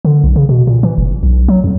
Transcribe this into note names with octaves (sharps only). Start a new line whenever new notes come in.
D3
B1
C#3
B2
A#2
E3
F#1
B1
F#3
F2